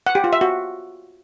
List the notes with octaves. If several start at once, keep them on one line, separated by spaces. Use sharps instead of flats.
F#5
G4
F4
E5
F#4